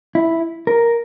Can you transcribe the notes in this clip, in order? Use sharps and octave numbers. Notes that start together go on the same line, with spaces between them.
E4
A#4